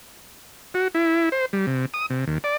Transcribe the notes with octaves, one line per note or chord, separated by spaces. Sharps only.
F#4
E4
C5
G3
C3
D#6
C3
D#2
D5